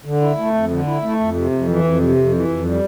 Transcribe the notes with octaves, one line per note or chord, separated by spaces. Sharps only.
D3
E4
A3
F2
D3
E4
A3
F2
C3
F2
E3
F2
C3
F2
E3
F2
G3